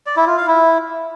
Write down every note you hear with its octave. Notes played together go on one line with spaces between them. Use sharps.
D5
E4
F4
F5
E4